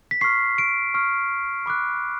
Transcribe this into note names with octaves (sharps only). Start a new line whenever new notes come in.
B6
C#6 F6 C7
D7
C#6 F6
B5 D6 F#6